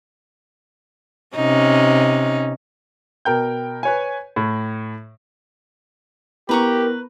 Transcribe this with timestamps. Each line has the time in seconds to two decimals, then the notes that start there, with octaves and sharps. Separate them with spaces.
1.36 C3 C#4 D#4
3.25 B2 A#4 G5 G6
3.83 B4 C#5 G#5
4.36 A2
6.49 B3 E4 G4 A#4 B4 A#5 C#6